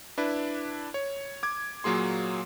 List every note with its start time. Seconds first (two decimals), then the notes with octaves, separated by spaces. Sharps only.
0.18 D4 E4 B4
0.94 C#5
1.43 D6 G#6
1.84 A#2 F#3 A#3 G#4 C6